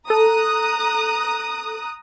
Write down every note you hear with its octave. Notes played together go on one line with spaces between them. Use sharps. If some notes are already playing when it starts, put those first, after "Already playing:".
A4 A#5 D#6 F#6